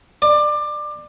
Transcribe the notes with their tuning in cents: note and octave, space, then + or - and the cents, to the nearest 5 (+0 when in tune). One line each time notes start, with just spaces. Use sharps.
D5 +20